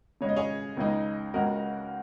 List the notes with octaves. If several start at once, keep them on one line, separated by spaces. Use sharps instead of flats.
C#3 G#3 C#4 C#5
D#5
G#4 C#5
C#2 C#3 G#3 D#4
C#2 C#3 G#3 F#4 A#4